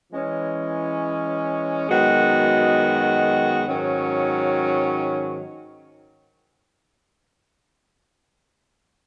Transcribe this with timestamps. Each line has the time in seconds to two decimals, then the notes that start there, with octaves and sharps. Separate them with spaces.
0.11 E3 G#3 C#4
1.88 F#2 D#3 G#3 B3 F#4
3.66 G#2 D#3 F#3 C#4